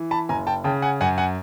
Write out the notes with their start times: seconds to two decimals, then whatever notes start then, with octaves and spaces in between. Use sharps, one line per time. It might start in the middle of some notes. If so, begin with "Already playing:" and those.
Already playing: E3
0.11 A5 B5
0.29 F#1 G#5 A#5
0.47 G5 A5
0.64 C#3 G5 A5
0.82 F#5 G#5
1.00 F#2 F#5 G#5
1.18 F#5 G#5